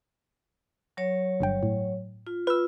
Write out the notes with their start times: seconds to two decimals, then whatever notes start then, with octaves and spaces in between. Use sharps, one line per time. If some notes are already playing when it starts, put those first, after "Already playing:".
0.97 F#3 C#5
1.40 G1 G2 G5
1.63 A2
2.27 F4
2.47 F4 B4 E6